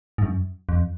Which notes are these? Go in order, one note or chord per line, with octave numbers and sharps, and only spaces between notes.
G#2
F#2
F2